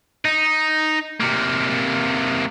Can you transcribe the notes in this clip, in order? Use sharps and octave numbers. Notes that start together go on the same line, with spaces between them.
D#4
C3 A#3